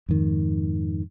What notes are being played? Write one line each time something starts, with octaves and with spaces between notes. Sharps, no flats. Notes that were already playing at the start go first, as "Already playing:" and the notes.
F2 G#2 D#3